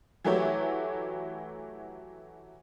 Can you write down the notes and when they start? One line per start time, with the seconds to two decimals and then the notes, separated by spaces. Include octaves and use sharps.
0.25 E3 F#3 A3 E4 G4 C#5